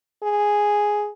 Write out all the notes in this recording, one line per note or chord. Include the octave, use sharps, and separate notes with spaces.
G#4